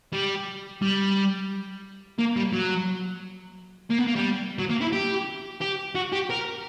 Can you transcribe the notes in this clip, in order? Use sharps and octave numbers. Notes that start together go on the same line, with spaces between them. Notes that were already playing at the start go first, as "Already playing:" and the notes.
G3
G3
A#3
G3
F#3
A#3
B3
A#3
G3
F#3
A#3
E4
G4
G4
F#4
G4
A#4